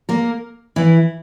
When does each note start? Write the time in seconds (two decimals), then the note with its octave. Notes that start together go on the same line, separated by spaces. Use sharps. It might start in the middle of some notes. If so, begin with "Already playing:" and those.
0.09 A#3 A#4
0.76 E3 E4